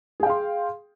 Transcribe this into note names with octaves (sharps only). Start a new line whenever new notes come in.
G#4 F5 G5 C6